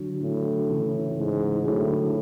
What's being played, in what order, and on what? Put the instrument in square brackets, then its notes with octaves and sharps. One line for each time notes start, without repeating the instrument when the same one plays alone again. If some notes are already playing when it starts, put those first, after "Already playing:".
Already playing: [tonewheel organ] D3 F#3
[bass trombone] A2
[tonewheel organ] C#3 E3
[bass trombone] G#2
[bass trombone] A2 [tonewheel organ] D3 F#3